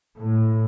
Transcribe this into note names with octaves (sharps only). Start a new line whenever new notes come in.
A2